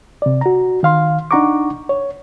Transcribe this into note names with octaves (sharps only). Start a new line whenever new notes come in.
C3 D5
F#4 A#5
D#3 F5 C6
D4 D#4 F#5 A#5 C#6 D6
C#5